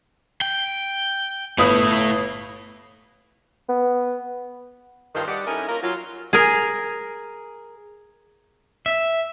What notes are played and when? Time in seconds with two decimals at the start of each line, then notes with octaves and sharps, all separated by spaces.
0.41 G5
1.58 G1 A3 E4 B4 D#6
3.69 B3
5.15 G2 D#3 F4 C5
5.28 G3 D5 D#5 F#5
5.47 C#4 D#4 E4 A4 A#4
5.68 A#3 C#4 F4 A#4
5.83 F#3 F4
6.33 G#4 A#4
8.86 E5